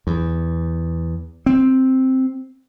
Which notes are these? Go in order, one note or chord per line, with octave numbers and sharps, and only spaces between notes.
E2
C4